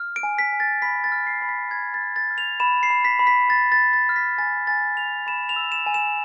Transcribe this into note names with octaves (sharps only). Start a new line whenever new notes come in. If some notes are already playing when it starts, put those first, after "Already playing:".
Already playing: F6
D7
G#5
B6
G#5
A6
B5 B6
A6
F6
C7
B5
B6
B5 G#6
A6
F6
A6
F6
F7
B5 E7
C7
B5
B6
B5
B6
B5 A6
A6
B5
A6
F6
B6
G#5 A6
G#5 A6
B5 F7
B5 E7
F7
E6
E7
G#5
E7